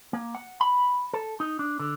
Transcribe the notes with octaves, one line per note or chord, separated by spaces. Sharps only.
A#3
F#5
B5
A4
D#4
D4
D3